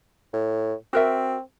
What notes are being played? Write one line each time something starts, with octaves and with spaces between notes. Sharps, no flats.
A2
C4 F#4 A#4 E5